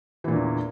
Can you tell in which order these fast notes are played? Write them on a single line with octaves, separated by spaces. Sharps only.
E3 A#2 D3 E2